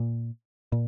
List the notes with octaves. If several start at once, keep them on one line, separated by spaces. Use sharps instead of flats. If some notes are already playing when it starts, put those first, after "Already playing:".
Already playing: A#2
A#2